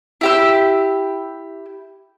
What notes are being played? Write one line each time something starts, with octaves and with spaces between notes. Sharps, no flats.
E4 G4 E6